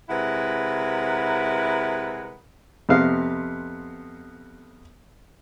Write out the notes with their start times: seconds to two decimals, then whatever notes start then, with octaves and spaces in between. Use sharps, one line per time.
0.09 C3 G#3 E4 A#4 B4 F#5
2.89 F2 C3 B3 F5